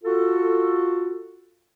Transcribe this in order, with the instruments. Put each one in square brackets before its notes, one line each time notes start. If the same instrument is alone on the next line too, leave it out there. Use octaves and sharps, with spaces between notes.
[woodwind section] F4 F#4 A4